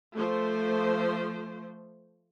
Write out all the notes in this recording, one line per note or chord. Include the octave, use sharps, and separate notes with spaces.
F3 A3 C5